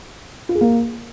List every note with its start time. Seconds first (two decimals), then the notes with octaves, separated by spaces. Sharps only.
0.49 F4
0.55 G#4
0.61 A#3